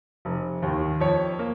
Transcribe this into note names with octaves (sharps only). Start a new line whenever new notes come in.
F1
D#2 D#3
F2 C#5
A#3